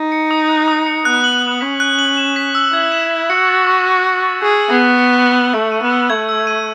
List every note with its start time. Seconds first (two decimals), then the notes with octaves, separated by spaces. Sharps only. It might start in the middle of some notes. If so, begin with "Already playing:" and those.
Already playing: D#4
0.12 C#7
0.31 D#6
0.49 F#6
0.68 D#6
0.86 C#7
1.05 B3 F#6
1.24 F#7
1.43 F#6
1.61 C#4 B6
1.80 F#6
1.99 F#7
2.17 E7
2.36 B6
2.55 E6
2.73 E4 G#6
2.92 E7
3.11 B6
3.29 F#4 C#7
3.48 A6
3.67 C#6
3.86 F#6
4.04 C#7
4.23 A6
4.42 G#4 F#6
4.60 F#7
4.70 B3
4.79 F#6
4.98 C#7
5.16 F#6
5.35 F#7
5.54 A3 E6
5.72 D#7
5.82 B3
5.91 E6
6.10 A3 G#6
6.29 E6
6.47 D#7